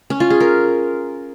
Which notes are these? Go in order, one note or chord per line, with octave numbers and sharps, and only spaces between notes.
C#4
F4
G#4
A#4